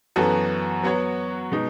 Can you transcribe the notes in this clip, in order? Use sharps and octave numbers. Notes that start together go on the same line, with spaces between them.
F#2 E3 B3 F#4 A4
F#3 B3 F#4 C#5
B2 G#3 D#4